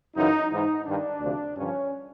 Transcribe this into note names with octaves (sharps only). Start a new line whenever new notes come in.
F#2 C#3 E3 D#4
G#2 E3 D#4
G2 D#3 D4
D2 C3 F3
G2 D3 F3 C#4